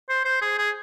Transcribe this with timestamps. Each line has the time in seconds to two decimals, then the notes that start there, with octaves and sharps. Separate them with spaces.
0.09 C5
0.25 C5
0.41 G#4
0.58 G#4